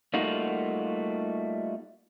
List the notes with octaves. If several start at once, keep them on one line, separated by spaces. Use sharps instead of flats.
G3 A3 A#3 D#4 F4 F#4